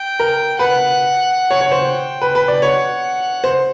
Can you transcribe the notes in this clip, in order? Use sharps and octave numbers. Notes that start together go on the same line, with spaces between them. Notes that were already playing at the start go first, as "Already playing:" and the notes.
Already playing: G5
A#4
B4 F#5
C#5
C#5
C5
G5
B4
B4
D5
C#5 F#5
C5